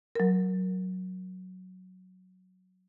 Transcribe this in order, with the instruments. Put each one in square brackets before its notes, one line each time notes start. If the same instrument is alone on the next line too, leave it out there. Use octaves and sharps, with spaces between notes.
[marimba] F#3 A#4